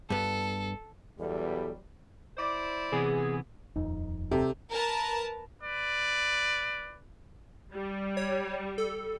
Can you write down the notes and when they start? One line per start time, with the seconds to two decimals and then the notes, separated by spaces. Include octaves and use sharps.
0.10 G2 B3 A4
1.19 E2 B2 F#3 G3 A4
2.38 E4 C5 D5
2.92 C3 E3 B3 G#4
3.76 D#1 F2 D#4
4.31 C3 G4 A4 A#5
4.72 A#4 B4 A5 A#5
5.62 B4 D5
7.74 G3
8.17 C#5
8.78 A4